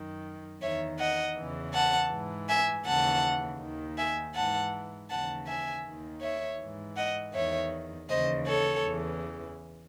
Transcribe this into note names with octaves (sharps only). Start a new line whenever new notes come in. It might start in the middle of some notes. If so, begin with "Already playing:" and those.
Already playing: F#2 D#3
E2 D#3 C#5 E5
D#5 F#5
E2 C#3 E3
F#5 A5
G#2 E3
E5 G#5
D#2 C#3 E3 F#5 A5
D#2 D#3
E5 G#5
G#2 E3 F#5 A5
D#2 C#3 E3 F#5 A5
E5 G#5
D#2 D#3
C#5 E5
G#2 E3
D#5 F#5
E2 D#3 C#5 E5
D#2 C#3 E3 C5 D#5
A4 C#5
E2 C#3 E3